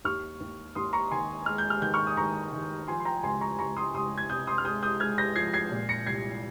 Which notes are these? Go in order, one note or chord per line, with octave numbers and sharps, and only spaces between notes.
D#2 C#6 F6
D#2
D#2 C6 D#6
A#5 C#6
D#3 G#5 C6
G#3 F6
G6
F6
D#3 G6
C#6 F6
D#6
D#3 A#5 C#6
D#3
F3 G#5 C6
C6
G5 A#5
C#2 G#5 C6
A#5 C#6
C#2 A#5 C#6
C6 D#6
C#2 C6 D#6
G#6
C3 D#6 G6
C6 D#6
F6
G#3 D#6 G6
D#6 G6
G#3 F6 G#6
G6 A#6
F3 G#6 C7
G#6 C7
A#2
A#6 C#7
C2 G#6 C7